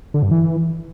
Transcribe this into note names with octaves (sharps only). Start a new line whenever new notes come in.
D3
G2
E3